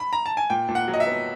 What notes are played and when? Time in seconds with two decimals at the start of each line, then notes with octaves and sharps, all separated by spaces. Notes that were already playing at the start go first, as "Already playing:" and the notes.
0.00 B5
0.13 A#5
0.26 A5
0.37 G#5
0.50 A#2 G5
0.69 A#2
0.75 F#5
0.88 F#3
0.94 D#5
1.00 E5
1.07 B3